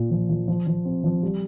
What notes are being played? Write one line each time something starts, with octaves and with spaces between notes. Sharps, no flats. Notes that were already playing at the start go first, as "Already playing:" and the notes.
Already playing: A#2 F4
F3
F3
F3
F3
C4
F3
G3